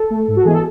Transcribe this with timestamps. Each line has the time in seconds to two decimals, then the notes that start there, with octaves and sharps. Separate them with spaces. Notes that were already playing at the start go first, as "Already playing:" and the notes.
Already playing: A4
0.10 A3
0.28 G#2
0.36 F#4
0.45 E3 G#3 B3 G#4
0.54 A4